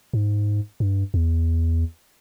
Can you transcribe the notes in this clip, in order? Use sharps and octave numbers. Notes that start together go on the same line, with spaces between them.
G#2
G2
E2